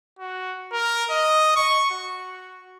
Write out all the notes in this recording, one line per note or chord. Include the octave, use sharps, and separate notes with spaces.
F#4
A#4
D#5
C#6
F#4